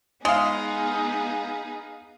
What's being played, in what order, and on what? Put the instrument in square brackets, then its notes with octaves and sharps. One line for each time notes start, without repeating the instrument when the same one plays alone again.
[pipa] G#3 [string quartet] B3 D#4 G#4 [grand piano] F5 D#6